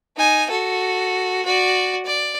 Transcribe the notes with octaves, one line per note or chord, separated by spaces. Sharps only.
D#4 G#5
F#4 A4
F#4 D5
D5